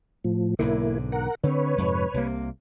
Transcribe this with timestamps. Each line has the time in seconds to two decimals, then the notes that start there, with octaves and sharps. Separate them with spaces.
0.24 A2 F3
0.59 B1 G#2 D3 A#3 E4
1.12 A#4 F#5
1.43 D3 C4 B4 C#5
1.78 F2 G#2 C3
2.14 C2 C3 A#3